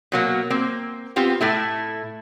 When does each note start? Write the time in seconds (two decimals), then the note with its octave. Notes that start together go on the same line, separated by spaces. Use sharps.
0.12 B2 F#3 A#3
0.50 A#3 C4
1.16 B3 C4 F4 G4
1.41 A2 A3 E4